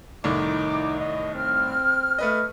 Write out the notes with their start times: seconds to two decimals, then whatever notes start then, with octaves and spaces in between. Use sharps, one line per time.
0.24 C2 A2 D#3 D#4 D6
1.00 D#5
1.34 C4 F6
2.18 A3 B4 D#5